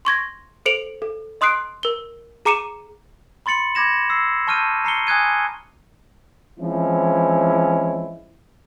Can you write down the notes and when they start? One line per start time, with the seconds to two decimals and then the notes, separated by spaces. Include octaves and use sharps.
0.05 C6 C#6 G#6 A#6
0.66 A4 C5 C#7 D7 F7 F#7
1.02 A4
1.41 D#5 C6 D#6 F#6 C7 D7
1.83 A#4 G7
2.45 G#4 A#5 D6 C#7 D#7 E7
3.46 B5 C6 A6 C#7 F#7
3.75 B5 D6 G#6 A#6 E7
4.10 E6 C7
4.48 A5 C#6 F6 G6 D#7
4.85 A#5 C7 C#7 G7
5.07 G#5 D#6 F#6 G#6 D#7
6.60 E3 F3 G#3 C4 C#4 E4